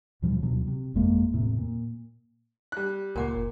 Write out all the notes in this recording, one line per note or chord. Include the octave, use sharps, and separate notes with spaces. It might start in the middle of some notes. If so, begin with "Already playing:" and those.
D#2 B2 F3 G3
D2 B2 F#3
C3
G1 F2 G#3 A#3
E2 A2 C3
A#2
G3 F#6
C#2 A#2 A#4 F#5 D6
F#1